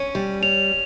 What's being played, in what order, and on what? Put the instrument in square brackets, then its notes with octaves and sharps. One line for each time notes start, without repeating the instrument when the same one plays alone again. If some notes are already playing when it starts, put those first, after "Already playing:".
Already playing: [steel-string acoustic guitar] C#4 [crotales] D#7
[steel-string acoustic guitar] G3
[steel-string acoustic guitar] C#4 [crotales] F7